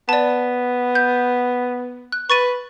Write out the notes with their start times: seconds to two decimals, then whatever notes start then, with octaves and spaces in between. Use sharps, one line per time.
0.09 B3 D5 A5
0.95 G6
2.12 F#6
2.30 B4 C#6 A6 D#7